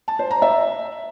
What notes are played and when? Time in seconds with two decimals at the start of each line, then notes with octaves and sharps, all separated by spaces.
0.08 A5
0.19 C5
0.31 A#5
0.42 E5